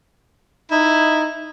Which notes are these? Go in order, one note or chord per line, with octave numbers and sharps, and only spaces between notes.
D#4 E4